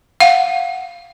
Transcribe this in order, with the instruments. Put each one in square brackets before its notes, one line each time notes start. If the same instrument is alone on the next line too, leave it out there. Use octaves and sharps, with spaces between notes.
[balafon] F5 F#5